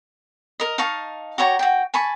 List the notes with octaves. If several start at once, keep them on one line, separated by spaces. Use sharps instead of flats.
A#4 D#5
D#4 F5 A5 C#6
F#4 G4 C#5 A#5
F#4 G5
G#5 A5 B5 C#6